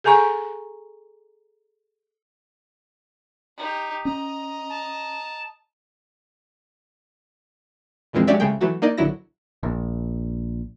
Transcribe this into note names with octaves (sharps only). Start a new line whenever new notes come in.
G#4 A4 G#5 A#5 C#6
D#4 G4
C#4 D#5 A#5
A5
F2 A#2 E3 F3 G#3 C4
F#3 G#3 C#4 G4 D5 E5
C2 C#3 G#3 A3 G#4 G5
E3 F#3 A3 F#4
A#3 D#4 D5 D#5
A#1 D3 F#3 E4 A#6
A#1